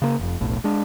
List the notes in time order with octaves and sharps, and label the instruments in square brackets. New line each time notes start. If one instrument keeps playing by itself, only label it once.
[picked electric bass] C#3 A#3
F1 F2
F1 B1 A2
G#3 D4